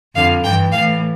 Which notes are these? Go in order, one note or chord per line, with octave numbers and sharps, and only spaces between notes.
F2 D3 F5
G2 E3 G5
A2 E3 F5